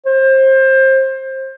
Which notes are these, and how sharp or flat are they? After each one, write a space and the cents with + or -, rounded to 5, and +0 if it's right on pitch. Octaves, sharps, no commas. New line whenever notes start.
C5 +25